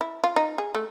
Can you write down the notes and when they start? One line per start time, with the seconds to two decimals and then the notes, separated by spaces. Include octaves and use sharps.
0.01 E4
0.24 F4
0.36 D#4
0.58 G#4
0.75 A3